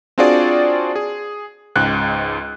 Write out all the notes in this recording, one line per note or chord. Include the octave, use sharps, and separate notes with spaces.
C4 D4 F4 F#4 G#4 D5
G#4
C#2 G#2 F#6